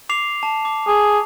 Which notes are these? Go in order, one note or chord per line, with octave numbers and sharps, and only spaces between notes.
D6 C7 F7
A5
D6
G#4